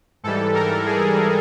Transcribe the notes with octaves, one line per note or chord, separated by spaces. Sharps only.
G#2 E3 G3 A4
A#4
G#4